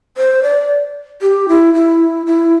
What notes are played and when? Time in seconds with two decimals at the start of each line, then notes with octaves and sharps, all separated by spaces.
0.17 C5
0.43 D5
1.22 G4
1.48 E4
1.74 E4
2.26 E4